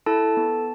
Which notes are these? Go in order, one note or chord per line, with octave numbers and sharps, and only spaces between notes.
E4 A4 A5
B3